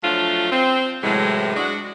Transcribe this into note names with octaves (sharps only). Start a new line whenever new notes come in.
F3 F#3 A3 D4 F4
C4
A2 C3 E3 F#3 G#3
G#3 D4 F#4